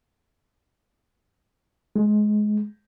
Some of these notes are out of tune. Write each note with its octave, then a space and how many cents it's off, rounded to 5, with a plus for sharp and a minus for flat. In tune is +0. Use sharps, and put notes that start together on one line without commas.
G#3 +20